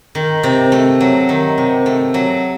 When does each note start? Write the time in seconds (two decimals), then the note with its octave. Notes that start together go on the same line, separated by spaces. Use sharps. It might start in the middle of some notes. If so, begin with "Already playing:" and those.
0.15 D#3
0.43 C3
0.72 A3
1.00 F#3
1.29 D#3
1.58 C3
1.86 A3
2.14 F#3